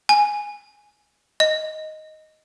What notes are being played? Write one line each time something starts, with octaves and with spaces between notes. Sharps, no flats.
G#5
D#5